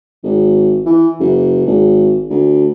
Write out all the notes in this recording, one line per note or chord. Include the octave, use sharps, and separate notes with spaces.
G#1
E3
F#1
G#1
D2